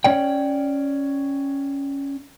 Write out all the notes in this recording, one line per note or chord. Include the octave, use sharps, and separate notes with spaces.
C#4 C#5 D5 G5